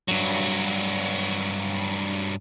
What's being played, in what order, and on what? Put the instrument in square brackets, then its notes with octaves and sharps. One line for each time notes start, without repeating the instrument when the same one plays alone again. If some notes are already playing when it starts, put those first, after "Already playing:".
[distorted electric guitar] G2 F#3